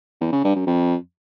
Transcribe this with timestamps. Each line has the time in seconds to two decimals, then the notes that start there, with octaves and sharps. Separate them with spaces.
0.21 E2
0.33 C#3
0.44 G2
0.56 F#2
0.67 F2